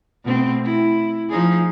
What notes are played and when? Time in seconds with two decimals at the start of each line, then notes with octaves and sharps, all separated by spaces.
0.24 B2 A3 C4
0.64 E4
1.30 F3 D#4 G#4